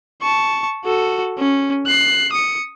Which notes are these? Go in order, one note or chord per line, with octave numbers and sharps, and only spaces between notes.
A5 C#6
F#4 A4
C#4
F#6 C7
D#6 C#7